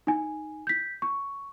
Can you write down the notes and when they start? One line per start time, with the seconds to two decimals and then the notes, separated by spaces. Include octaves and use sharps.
0.07 D#4 G#5
0.67 G6 B6
1.02 C#6